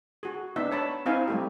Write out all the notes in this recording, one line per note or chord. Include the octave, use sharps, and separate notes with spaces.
F#4 G#4
B3 D4 D#4 E5
C#5 A5 B5
C4 D#4 E4 C5 F5 G#5
G3 A3 G4